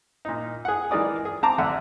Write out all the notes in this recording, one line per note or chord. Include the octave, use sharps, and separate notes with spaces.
A#2 D#4
G#4 F#5
E3 G#3 A#4 D5 D#6
G#4
C4 A5 A#5 D6
A1 D3 E5 F#5 F#6